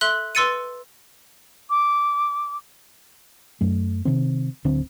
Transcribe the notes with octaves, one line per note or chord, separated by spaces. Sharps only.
A4 E5 C6 F#6 G7
B4 C6 E6 A6 C#7 D#7
D6
F#2 A3
C3 D#3 C4
D1 D3 C4